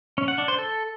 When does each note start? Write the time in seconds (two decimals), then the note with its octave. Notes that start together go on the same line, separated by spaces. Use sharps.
0.18 C#4
0.28 F#5
0.38 D4
0.48 C5
0.58 A4